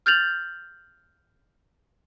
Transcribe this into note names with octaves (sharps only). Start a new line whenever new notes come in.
F6 G6 A6 F7 F#7